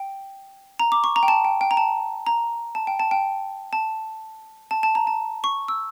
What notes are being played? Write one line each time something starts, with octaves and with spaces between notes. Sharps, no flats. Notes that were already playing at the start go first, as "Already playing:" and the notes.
Already playing: G5
A#5
D6
C#6
A#5
G5
A5
G5
G5
A#5
A5
A#5
A5
G5
A5
G5
A5
A5
A5
A#5
A5
C#6
E6